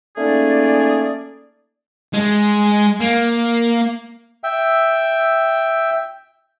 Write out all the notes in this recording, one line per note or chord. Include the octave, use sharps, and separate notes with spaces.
A3 A#3 C#4 D#4 G#4 D5
G#3
A#3
E5 G5